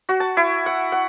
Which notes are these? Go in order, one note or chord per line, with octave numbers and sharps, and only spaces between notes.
F#4
A5
E4
F#5
F#5